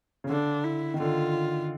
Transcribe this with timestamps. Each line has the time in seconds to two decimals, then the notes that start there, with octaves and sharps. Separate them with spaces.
0.24 C#3
0.29 D3 D4
0.64 E4
0.94 D#3
1.00 D3 F4